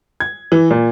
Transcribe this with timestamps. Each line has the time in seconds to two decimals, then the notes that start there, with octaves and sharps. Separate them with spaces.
0.20 G#6
0.52 E3
0.70 A#2